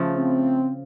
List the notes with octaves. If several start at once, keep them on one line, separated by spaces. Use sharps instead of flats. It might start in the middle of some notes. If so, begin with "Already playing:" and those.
Already playing: C#3 F3 A3
C4